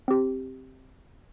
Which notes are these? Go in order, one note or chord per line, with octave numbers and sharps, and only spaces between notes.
C4 G4